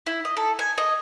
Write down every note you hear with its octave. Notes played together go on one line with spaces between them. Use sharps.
E4
D#5
A4
G#5
D#5